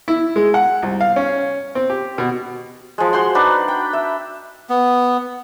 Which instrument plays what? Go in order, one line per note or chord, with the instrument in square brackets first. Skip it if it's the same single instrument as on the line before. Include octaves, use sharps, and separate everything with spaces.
[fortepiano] E4
G#3
F#5
C2
F5
C#4
C4
G4
B2
[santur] F3 G#3
F#4 C5 F#5 C6
D4 D#4 B4 F#5
G5
E5
[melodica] B3